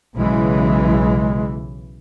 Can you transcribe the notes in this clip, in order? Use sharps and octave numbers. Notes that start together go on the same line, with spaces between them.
B1 C#3 E3 G#3